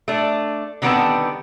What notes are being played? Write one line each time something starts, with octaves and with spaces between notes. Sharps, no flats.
A3 D4
D3 D#3 G3 B3 C4 A5